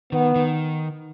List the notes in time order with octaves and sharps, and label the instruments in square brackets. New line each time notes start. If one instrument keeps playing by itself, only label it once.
[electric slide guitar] D#3 [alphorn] B3
[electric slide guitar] D#3